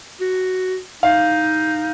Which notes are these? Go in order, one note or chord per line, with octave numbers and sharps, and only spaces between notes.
F#4
D#4 F5